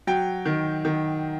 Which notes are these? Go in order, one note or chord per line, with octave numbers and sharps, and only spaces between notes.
F#3 G5
D#3
D#3